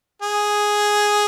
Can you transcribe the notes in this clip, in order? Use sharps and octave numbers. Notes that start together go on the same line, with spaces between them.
G#4